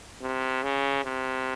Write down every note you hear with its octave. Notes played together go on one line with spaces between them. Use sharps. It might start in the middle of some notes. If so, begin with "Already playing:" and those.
C3
C#3
C3